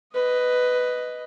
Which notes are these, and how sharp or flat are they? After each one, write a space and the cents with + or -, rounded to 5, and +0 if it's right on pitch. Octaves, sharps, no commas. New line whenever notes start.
B4 +5 D#5 +0